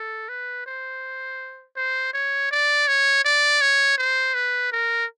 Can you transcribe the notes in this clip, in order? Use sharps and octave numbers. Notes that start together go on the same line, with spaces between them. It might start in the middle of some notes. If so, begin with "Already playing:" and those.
Already playing: A4
B4
C5
C5
C#5
D5
C#5
D5
C#5
C5
B4
A#4